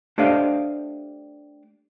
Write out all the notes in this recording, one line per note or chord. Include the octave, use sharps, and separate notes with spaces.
A3 D4 G4 C5 D#5 F5